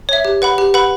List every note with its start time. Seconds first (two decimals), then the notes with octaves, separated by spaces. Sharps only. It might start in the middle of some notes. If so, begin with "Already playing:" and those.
0.09 C#5 E5
0.25 G4
0.42 B4 F#5 B5
0.58 G4
0.74 B4 F#5 B5